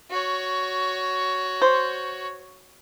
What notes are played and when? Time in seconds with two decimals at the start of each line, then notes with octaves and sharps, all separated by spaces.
0.11 F#4 C#5
1.62 C5